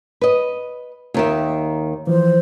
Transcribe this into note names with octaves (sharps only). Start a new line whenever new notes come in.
B4 D#5
D#2 D#3 E5
E3 F3 C5